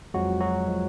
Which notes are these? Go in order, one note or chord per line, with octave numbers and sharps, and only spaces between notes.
F2 F3 F#3 G#3 F#4
F#3 F#4
F3 G#3